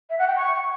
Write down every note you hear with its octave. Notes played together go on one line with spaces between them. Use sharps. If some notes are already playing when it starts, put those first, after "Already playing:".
E5
F#5
G5
C#6